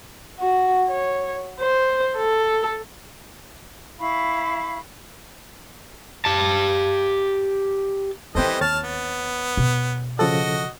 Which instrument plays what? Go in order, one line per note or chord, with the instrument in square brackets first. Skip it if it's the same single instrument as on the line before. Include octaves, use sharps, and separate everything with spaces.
[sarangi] F#4
C#5
C5
A4
[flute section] E4 F5 B5 C#6
[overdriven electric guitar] G4 A5
[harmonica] E3 G3 D#5 [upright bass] C4 F4 [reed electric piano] A4 C5 G5
[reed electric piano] D#2 C#5 A6 [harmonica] A5 F6
[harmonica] B3
[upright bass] B2
[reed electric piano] C#3 F3 A4 [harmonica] F#4 D#5